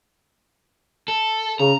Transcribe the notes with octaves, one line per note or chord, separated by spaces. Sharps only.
A4
C#3 A#5